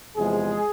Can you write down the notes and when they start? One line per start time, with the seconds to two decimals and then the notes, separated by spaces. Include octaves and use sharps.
0.16 E2 C3 F3 G#3 G#4